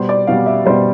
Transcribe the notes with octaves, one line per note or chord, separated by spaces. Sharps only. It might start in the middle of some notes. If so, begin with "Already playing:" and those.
Already playing: B2 G3 C5
D5
B2 G3 F5
E5
B2 G3 C5